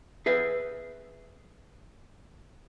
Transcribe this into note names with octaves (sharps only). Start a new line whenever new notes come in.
G#4 B4 E5